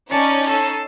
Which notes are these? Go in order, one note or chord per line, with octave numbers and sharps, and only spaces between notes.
C#4 D#4 D5 A5 C#7
A4 C7 D#7